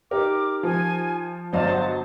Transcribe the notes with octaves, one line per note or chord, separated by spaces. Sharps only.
D#4 G4 A#4 D6
F3 G#5
G1 F#3 C5 D5 D#5 F5 A5
C5 F#5